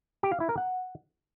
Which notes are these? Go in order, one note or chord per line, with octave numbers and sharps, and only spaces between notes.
G4
F5
E4
A#4
F#5